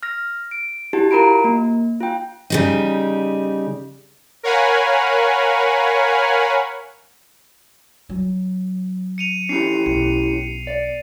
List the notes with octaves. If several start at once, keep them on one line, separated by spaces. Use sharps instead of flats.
F6 A#6
D7
E4 F#4 G4 A5
F4 A#4 A#5 B5 D7
A#3
F4 G5
C#3 G3 D#4
A#4 C#5 F5 F#5 G#5 B5
F#3
C#7 D#7 F7
C#4 E4 G4 C7
B1
D5